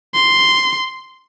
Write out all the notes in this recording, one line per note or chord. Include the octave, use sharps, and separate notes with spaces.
C6